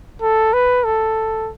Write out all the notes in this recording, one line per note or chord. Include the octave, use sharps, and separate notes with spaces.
A4
B4
A4